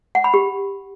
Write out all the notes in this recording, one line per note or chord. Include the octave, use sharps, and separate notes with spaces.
F#5
B5
G4